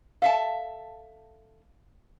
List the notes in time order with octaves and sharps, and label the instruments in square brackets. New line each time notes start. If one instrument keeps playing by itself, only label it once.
[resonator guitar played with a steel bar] A4 E5 A5 [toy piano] F5